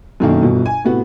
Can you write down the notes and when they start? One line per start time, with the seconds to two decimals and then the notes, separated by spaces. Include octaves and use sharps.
0.20 F#2 B2 D#3 A3 A#3 D4
0.42 G1 B2
0.66 G#5
0.84 A2 C3 B3 F#4